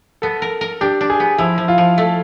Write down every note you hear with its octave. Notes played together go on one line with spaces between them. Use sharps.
B3 A4
A#4
A#4
D4 G4
D4
G#4
B3
F3 E4
F3
F4
F3
A3